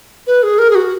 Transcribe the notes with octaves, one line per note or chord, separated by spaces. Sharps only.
B4
G#4
A#4
G#4
F#4